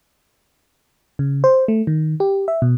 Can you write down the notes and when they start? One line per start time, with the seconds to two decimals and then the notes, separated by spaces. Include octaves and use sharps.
1.19 C#3
1.44 C5
1.68 A3
1.87 D#3
2.20 G4
2.48 E5
2.62 B2